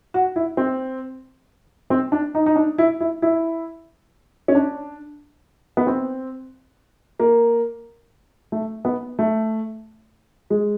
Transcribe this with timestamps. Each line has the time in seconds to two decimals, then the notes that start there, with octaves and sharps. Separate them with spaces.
0.14 F#4
0.36 E4
0.57 C4
1.90 C4
2.12 D4
2.35 D#4
2.46 D#4
2.56 D4
2.78 E4
3.00 E4
3.22 E4
4.48 C#4
4.55 D4
5.77 B3
5.87 C4
7.20 A#3
8.52 A3
8.85 B3
9.19 A3
10.50 G#3